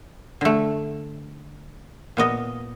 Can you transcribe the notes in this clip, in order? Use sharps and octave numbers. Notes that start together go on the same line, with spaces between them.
D3 A3
A#2 B3 D#5